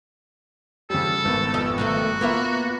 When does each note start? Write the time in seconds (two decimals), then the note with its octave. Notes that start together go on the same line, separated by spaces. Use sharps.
0.90 C#3 F3 G3 A4
1.25 G#1 B3
1.54 F2 D#5
1.78 G2 D#3 A3 F#4
2.21 A#3 B3 F4 E5 B5